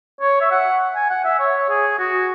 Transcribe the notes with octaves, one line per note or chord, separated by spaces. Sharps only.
C#5
E5
F#5
G#5
F#5
E5
C#5
G#4
F#4